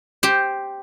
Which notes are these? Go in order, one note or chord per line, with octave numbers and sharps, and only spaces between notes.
G4 C5